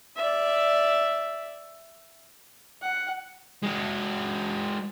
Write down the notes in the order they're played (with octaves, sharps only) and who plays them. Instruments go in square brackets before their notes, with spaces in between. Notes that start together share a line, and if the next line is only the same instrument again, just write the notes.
[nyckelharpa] D5 E5
[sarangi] F#5
[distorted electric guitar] G#3 F#4